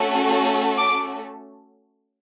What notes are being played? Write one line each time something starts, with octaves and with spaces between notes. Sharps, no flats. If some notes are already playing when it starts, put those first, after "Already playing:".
Already playing: A3 C#4 F#4 A4
D6